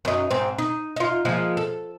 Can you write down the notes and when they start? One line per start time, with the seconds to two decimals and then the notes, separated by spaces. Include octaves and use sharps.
0.05 F#2 D#4
0.31 G#2 C4
0.58 D#4
0.96 D#4 F4
1.25 F3 G#3 A#3
1.57 A4